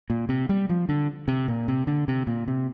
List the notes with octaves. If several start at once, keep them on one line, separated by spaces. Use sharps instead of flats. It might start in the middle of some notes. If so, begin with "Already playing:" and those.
A#2
C3
G3
F3
D3
C3
A#2
C3
D3
C3
A#2
C3